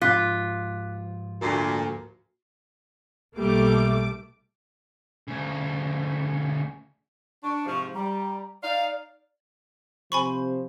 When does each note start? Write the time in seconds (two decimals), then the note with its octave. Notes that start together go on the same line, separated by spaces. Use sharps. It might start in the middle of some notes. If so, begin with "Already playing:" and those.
0.02 G#2 F3 F4 D6 F#6 B6
1.41 D2 A#2 F#4 C7
3.36 B1 G3 A3 A#3 D6
5.28 D2 C#3
7.43 D4 C#6
7.66 G#2 C3 F3
7.95 G3 A#5
8.63 D#4 D5 F5
10.12 C3 F3 C5 G#5 B5 C#6